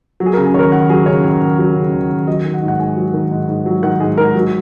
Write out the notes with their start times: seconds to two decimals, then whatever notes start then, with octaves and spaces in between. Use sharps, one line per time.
0.20 F#3
0.26 G#4
0.33 C#3 A#4
0.46 G#4
0.54 D#2 A#4 C#5
0.72 D#2 F#5
0.89 F#3 G#4
1.06 C#3 C#5
1.24 D#2
1.41 D#2
1.59 F#3
1.76 C#3
1.93 D#2
2.10 D#2
2.27 F#3 D#5
2.45 D#3
2.54 F#5
2.62 G#2
2.68 F#5
2.79 G#2 G#5
2.97 F#3
3.14 D#3
3.31 G#2
3.49 G#2
3.66 F#3
3.83 D#3 F#5
4.00 G#2 G#4
4.17 G#2 A#4
4.35 F#3